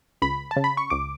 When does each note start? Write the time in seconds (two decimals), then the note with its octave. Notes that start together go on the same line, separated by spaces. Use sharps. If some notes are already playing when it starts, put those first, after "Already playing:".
0.22 C#2 B5
0.51 A5
0.56 C#3
0.64 B5
0.77 C#6
0.90 C#2 D6